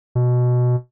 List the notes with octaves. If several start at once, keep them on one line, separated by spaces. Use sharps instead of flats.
B2